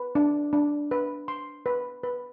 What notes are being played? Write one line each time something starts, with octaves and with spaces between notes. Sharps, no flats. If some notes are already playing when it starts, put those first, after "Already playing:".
Already playing: B4
D4
D4
B4
C6
B4
B4